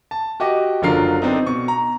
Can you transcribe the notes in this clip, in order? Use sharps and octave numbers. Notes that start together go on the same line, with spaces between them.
A5
F#4 G4 D#5 D6
F#1 D3 F#3 F4 A#4 C7
B3 C4 D4 D#4 A4
B2 C#6
A#5